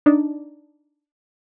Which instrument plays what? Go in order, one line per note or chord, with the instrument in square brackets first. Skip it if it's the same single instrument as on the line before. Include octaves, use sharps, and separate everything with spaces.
[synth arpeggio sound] D4 D#4 D5